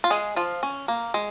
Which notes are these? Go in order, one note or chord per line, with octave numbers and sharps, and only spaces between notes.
F4
G#3 G#4
F3 F4
C#4
A#3
G#3